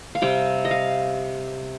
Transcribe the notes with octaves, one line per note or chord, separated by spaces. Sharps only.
F5
C3 G3 C4 G5
D#5
F5